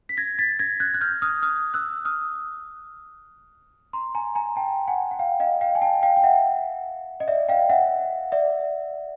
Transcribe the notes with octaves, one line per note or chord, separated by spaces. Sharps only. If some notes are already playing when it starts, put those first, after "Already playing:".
B6
G#6 A#6
A6 B6
G#6 A#6
F#6 G#6
F#6
F6 G6
D#6 F6
D#6 F6
E6 F#6
D#6 F6
A#5 C6
G#5 A#5
G#5 A#5
G5 A5
F#5 G#5
F#5
F5 G5
D#5 F5
F5 G5
G#5
G5 A5
F5 G5
G5
E5 F#5
D#5
D5 E5
F5 G5
E5 F#5
D5 E5